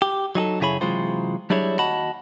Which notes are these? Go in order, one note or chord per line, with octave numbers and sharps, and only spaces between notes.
G4
F#3 D#4 G#4 A4
F#2 C#3 E4 G#4 C#5 B5
C3 E3 F#3 G#3 F4 C5
F#3 G3 D4 E4 G#4 C#5
D#2 F#4 D#5 F#5 A5 B5